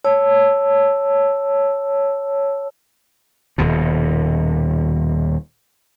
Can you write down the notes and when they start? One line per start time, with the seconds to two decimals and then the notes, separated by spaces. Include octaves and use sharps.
0.04 C#5 A5 E6
3.58 D#1 D#2 B2